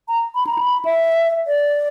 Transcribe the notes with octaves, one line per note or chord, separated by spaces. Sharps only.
A#5
B5
A#5
B5
E5
D5